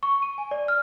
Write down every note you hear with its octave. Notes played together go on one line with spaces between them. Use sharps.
C#6
D#7
G#5
D5
F6